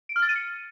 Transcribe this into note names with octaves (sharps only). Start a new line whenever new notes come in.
D7
F6
A6
D#7
C#7